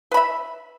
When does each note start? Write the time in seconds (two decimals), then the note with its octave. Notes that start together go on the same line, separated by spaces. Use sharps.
0.11 B4
0.14 B5
0.17 E5